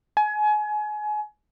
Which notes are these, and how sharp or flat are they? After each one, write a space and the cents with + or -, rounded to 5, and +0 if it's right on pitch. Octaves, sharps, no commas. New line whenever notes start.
G#5 +30